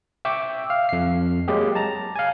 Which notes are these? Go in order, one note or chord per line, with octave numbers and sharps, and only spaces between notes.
E5 G5 C#6 D6 E6
F5
F2 C7
F#3 G#3 A#3 G4 G#4
A5 A#5
F5 G#5